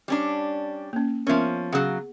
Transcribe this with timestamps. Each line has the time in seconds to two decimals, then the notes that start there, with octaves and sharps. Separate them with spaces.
0.08 G3 C#4 D4
0.93 A#3 C#4
1.27 F3 B3 C#4 A#4 E5
1.73 C#3 F#3 G#4 F#5